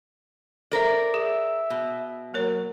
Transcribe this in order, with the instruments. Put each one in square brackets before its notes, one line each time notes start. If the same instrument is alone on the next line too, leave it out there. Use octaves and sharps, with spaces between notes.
[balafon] A4 C5 E5 [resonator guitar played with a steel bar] A#4 D5
[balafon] G#4 [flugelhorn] E5
[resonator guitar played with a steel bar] B2
[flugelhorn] F#3 [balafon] A#3 A#4 C#5